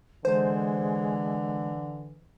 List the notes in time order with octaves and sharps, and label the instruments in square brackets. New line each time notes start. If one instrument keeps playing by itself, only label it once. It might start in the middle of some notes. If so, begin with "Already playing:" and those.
[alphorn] D3 [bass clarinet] E3 [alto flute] G#3 [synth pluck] C5